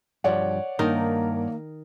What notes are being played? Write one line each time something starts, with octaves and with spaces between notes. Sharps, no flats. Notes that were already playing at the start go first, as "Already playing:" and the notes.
G2 F3 G3 C#5 D5 F#5
G2 D#3 A#3 D4 D#4 A#4